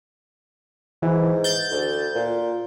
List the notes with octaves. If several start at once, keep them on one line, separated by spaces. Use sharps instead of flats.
G#2 E3
G6 A6
D2
A#2